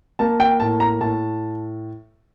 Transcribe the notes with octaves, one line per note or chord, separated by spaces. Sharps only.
A#3 A5
G5
A2 A5
A#5
A2 A5